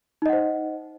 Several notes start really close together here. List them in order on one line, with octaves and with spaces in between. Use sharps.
D#4 D#5 F#5 C5